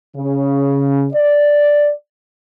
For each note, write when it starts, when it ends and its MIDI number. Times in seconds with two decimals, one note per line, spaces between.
0.17 1.07 49
1.13 1.90 74